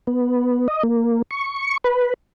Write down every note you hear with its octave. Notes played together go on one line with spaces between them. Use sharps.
B3
D#5
A#3
C#6
B4